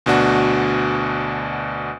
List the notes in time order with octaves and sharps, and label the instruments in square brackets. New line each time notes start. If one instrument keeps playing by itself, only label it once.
[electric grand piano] D2 B2 D4 F#4